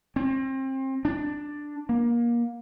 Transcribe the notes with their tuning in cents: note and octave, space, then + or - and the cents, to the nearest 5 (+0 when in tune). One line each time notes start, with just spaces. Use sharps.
C4 +30
D4 +5
A#3 +25